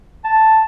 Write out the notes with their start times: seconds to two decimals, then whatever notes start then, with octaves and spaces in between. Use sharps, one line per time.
0.24 A5